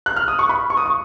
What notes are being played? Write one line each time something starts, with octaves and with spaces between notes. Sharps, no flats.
F#6
F6
D#6
C#6
B5
C#6
D#6
C#6